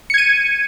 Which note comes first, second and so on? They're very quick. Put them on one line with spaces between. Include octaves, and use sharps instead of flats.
C#7 G#6 D#7